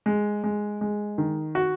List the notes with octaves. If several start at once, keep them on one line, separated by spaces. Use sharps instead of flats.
G#3
G#3
G#3
D#3
F#4